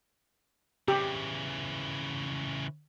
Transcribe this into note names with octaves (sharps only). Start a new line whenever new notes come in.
C#3 E3 G4